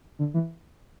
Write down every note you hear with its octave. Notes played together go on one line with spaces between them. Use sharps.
D3
E3